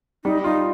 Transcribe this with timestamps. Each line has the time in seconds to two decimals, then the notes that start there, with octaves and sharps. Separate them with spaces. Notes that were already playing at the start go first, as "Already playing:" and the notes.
0.25 G3 D#4
0.44 D#4 F4